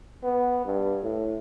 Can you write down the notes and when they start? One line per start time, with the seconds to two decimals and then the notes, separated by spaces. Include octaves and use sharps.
0.23 B3
0.66 G2
1.03 A2